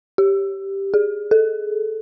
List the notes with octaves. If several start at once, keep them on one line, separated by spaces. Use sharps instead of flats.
G4
G#4
A4